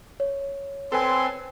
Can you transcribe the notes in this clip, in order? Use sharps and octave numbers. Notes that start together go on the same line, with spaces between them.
C#5
C4 A4 B4 G#5 C6